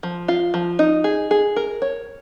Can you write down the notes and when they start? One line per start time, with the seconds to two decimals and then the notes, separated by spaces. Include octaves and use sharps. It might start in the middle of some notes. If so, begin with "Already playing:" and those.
0.03 F3
0.28 F4
0.54 F3
0.79 D#4
1.04 G#4
1.31 G#4
1.56 A#4
1.82 C#5